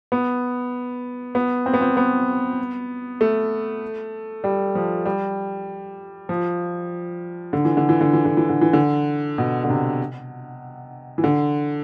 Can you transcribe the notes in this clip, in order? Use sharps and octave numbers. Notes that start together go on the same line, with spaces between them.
B3
B3
C4
B3
C4
B3
A3
G3
F3
G3
F3
D3
E3
D3
E3
D3
E3
D3
E3
D3
E3
D3
B2
D3
C3
E3
D3